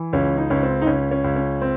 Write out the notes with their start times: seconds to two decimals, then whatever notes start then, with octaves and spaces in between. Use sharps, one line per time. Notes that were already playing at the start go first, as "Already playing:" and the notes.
Already playing: E3
0.13 C#2 C#4
0.37 D#4
0.50 C#2 C#4
0.63 C4
0.82 D#4
0.86 C#2 C#4
1.11 C#4
1.24 C#2
1.36 C#4
1.62 C4